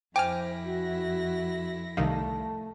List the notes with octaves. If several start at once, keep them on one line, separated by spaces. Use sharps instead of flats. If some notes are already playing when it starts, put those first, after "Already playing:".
F2 E4 C5 G5 G#5 D6 F6 A#6
F#4
C2 D#3 A3 F5